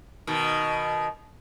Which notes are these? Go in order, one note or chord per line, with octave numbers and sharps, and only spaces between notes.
B2 D#3